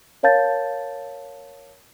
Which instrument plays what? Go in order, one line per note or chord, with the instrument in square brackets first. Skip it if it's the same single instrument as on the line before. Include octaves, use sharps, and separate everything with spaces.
[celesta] A#4 C#5 F5 A5 G6 A6